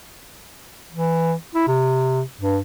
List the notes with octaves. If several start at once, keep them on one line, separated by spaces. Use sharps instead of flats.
E3
E4
C3
G2